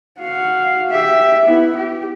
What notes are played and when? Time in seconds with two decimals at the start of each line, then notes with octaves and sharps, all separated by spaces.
0.21 F#4 F5
0.90 G4 E5
1.45 B3 E4
1.76 G4